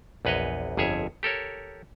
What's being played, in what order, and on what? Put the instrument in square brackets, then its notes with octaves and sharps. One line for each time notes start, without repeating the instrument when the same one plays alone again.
[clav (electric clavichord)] A#1 E2 B4 C#5 D#5
G1 F2 G#4 C#5 E5
G4 A4 A#4 C#5